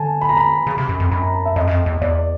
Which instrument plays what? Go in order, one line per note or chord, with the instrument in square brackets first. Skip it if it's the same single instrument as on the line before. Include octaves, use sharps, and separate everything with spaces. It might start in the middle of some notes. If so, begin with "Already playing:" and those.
Already playing: [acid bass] D3 [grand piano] G#5 A5
[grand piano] B5
A#5
B5
[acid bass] C#3
C3
F#2
F2
[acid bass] F#2 [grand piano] B5
[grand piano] A#5
A5
E5
[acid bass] F2 [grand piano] D#5
[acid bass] F#2
F2
E2
[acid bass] E2 [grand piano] D5